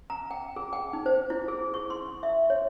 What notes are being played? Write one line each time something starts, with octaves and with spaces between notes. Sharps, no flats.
A#5
G5
G#4
G5
D#4
C5
E4
G#4
C#6
C6
E5
C#5